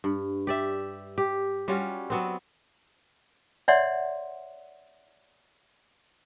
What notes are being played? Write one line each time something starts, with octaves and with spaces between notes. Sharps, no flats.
G2
G4 D5 E5
G4
G3 C#4 F4 F#4
F#3 B3 C4
C#5 D5 E5 F#5 C6